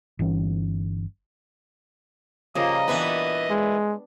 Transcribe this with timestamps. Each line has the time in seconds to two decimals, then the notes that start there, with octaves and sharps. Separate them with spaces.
0.19 G1 E3 C#4
2.55 C#3 F3 G3 A#3 D#5
2.88 A#2 E3 B3 D4 B4 C#6
3.50 G#3